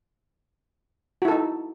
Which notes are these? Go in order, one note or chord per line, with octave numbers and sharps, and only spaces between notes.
D#4 E4 F#4 A4